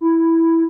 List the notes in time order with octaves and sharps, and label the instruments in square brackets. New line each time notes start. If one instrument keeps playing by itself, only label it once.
[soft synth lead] E4